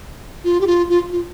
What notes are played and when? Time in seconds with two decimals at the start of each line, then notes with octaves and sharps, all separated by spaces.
0.45 F4
0.61 G4
0.67 F4
0.90 F4
1.12 F4